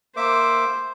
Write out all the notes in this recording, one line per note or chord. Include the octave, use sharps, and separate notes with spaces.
A#3 C5 E5 D6